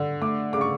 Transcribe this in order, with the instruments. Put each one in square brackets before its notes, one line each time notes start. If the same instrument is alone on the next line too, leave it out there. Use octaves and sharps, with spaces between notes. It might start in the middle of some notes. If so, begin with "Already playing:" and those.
Already playing: [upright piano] D3
A3 D6
C#3 D6
C#6